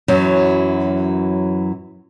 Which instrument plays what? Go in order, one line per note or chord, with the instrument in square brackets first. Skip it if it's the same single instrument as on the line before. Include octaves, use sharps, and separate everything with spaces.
[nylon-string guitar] F#2 E3 F#3